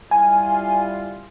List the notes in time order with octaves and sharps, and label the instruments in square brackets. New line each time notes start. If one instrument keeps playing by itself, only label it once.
[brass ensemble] G3 E4 F4 [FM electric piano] G#5